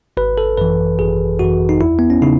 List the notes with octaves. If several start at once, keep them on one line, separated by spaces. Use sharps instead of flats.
G#1 B4
A4
F#2 E3 B4
G#1 G#4
F#2 E3 F#4
D#4
E2 E4
B3
C#4
C#3 D#4